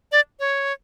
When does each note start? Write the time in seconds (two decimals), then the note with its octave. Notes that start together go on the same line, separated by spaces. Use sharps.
0.12 D5
0.40 C#5